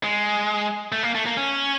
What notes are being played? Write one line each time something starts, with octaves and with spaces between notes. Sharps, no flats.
G#3
A3
A#3
A3
A#3
C#4